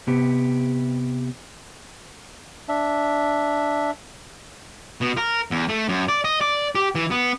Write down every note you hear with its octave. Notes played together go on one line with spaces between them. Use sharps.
C3 B3 G4
D4 E5
B2
A#4
E2
A3
F#2
D5
D#5
D5
G4
E3
B3